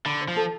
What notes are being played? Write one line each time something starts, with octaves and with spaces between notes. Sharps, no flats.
D3 B5
C5
F3
A4